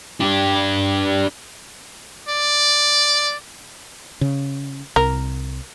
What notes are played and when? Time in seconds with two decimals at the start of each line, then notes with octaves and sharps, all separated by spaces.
0.20 D4 G4
2.29 D5
4.21 C#3
4.96 C2 A#4